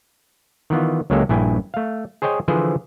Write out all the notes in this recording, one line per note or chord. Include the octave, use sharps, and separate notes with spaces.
D#3 E3 B3 F4
C#2 F#3 G#3 A#3 G4 A4
A#1 G2 E4 G5 G#5
A3 F5
G#4 C5 C#5 D#5 G5 G#5
D3 E3 F3 G#4 B4 C5